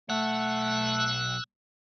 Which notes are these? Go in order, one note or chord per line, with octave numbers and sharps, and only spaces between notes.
B1 A3 F#5 E6 F#6